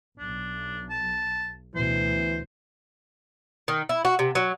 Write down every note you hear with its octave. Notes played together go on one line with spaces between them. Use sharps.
B1 D4
A5
D2 B2 E3 C5
D#3
E4
F#4
C3
F#3